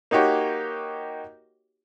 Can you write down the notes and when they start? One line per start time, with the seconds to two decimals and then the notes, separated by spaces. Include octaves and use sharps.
0.11 A#3 D#4 F#4 G4 C#5